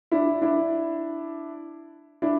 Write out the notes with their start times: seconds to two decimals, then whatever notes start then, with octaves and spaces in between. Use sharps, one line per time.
0.12 D4 E4
0.42 D4 E4
2.22 D4 E4